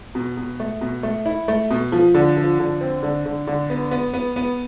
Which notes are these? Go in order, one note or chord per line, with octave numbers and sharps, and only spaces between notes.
B2
B2
A3
B2
A3
E4
A3
B2
F3
D3
F3
D3
C4
D3
D3
D3
B3
B3
B3
B3